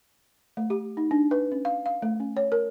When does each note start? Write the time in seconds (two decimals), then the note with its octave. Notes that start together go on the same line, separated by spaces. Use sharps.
0.57 A3
0.70 G4
0.97 D#4
1.11 D4
1.31 B4
1.52 C#4
1.65 F5
1.86 F5
2.02 A3
2.20 C#4
2.37 C#5
2.52 A#4